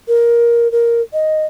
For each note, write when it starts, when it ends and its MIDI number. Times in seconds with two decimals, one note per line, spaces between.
0.08 0.70 70
0.72 1.01 70
1.13 1.46 75